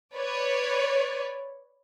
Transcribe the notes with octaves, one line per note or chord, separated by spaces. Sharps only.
B4 C#5 D5